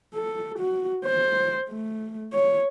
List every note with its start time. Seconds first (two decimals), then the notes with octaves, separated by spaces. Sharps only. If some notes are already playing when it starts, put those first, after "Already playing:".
0.14 A4
0.58 F#4
1.05 C5
1.69 A3
2.33 C#5